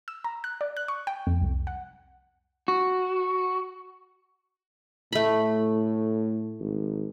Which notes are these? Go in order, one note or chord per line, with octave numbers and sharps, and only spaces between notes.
E6
A#5
F#6
D5
F#6
C#6
G5
F2
C2
F#5
F#4
A2 A3 B5
G#1